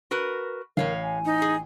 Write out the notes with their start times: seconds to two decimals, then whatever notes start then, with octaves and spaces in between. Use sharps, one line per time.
0.11 F#4 A#4 B4
0.77 A1 A2 A#4 C#5 F5
1.02 G#5
1.25 D#4
1.42 G#4